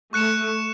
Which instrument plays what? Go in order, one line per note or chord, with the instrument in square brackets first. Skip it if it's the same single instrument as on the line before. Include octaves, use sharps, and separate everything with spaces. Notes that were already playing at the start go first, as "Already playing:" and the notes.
[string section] A3 [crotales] C#6 F#6 C#7 E7